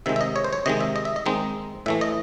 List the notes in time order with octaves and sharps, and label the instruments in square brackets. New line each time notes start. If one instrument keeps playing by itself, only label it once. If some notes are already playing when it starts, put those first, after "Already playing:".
[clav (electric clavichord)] C3 D#3 G#3 E5
E5
D#5
C#5
C5
C#5
C3 D#3 G#3 D#5
E5
D#5
E5
D#5
D#3 G#3 C4 D#4
A2 E3 A3 E5
D#5